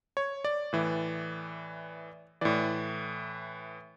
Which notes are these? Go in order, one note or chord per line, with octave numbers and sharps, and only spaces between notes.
C#5
D5
A2 E3
A2 E3 D5